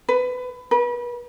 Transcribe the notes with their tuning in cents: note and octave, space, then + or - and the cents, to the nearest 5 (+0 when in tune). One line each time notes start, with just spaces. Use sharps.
B4 +20
B4 -35